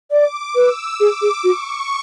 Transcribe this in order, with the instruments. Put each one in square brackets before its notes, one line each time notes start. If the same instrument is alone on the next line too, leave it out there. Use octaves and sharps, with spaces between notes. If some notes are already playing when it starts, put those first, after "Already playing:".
[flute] D5 [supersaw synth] D6
[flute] B4 [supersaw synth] E6
[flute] G#4 [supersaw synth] D6
[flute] G#4
[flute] F#4 [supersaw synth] C#6